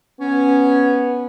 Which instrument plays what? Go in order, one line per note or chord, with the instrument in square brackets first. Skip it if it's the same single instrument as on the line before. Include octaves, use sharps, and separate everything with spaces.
[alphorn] B3 [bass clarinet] C#4